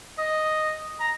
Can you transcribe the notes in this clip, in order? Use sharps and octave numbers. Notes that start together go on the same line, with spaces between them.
D#5
A#5